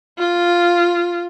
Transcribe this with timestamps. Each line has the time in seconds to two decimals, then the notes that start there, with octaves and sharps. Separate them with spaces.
0.19 F4